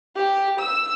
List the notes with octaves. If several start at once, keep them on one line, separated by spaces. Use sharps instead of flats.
G4
E6